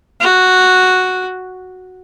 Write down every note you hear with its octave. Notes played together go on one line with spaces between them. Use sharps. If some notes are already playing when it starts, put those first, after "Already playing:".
F#4